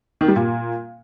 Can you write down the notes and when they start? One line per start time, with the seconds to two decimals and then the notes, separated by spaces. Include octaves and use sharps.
0.21 D#3
0.28 G3
0.36 A#2